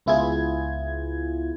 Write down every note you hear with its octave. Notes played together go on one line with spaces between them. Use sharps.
C#2 B3 E4 F4 G#4 G#6